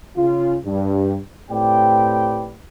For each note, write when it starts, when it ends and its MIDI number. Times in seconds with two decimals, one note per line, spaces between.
0.17 0.56 49
0.17 0.56 65
0.65 1.17 43
1.51 2.51 45
1.51 2.51 60
1.51 2.51 67
1.51 2.51 71
1.51 2.51 74
1.51 2.51 79